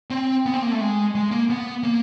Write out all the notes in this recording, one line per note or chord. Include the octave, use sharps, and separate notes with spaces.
C4
B3
C4
A#3
A3
G#3
G#3
A#3
B3
A#3